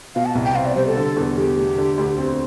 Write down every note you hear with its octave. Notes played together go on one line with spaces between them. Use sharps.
B2 F5
A5
C2
G5
C4 F5
D5
G3 C5
A4
D3
E2
E2 G4
A3
D3
D2
C4